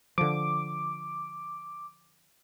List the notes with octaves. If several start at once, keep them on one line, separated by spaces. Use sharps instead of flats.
D3 F3 D6